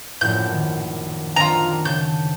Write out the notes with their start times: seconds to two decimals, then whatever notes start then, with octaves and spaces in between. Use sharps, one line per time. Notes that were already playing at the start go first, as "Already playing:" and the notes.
0.21 A#1 F#2 A2 G6
0.52 D#3
1.36 D#3 C4 D4 F4 A#5
1.85 C#3 A5 G6